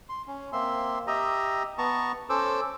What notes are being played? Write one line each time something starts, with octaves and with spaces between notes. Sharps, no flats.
C6
C#4
A#3 C4 E5 C6
G4 D#5 E5 A#5
B3 A5 A#5 C#6
C#4 A4 C5 D6 E6